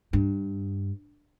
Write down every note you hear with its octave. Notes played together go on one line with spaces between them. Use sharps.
G2